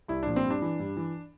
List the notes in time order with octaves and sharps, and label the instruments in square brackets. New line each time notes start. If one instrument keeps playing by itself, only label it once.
[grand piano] C2 E4
A#2 F3 D4
C4
G2
D4
E3
G2
E3